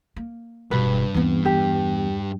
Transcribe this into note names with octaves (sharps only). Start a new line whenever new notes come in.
A#3
E1 G2 B2 B4
D#2 E3 B3 C4
E2 G4